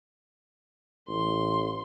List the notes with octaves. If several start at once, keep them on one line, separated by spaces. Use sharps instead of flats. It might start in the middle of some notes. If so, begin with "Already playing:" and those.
A1 C6